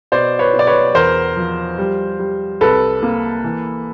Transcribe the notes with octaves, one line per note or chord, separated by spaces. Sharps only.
B2 C5 D5
B4 C#5
B2
D5
B4 C#5
E2 A#4 C5
F3
G3
G3
C2 A4 B4
A#3
E3